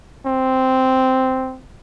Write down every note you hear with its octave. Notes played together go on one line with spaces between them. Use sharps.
C4